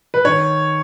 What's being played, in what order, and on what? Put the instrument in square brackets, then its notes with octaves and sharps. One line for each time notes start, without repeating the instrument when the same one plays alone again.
[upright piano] B4
D#3 C#5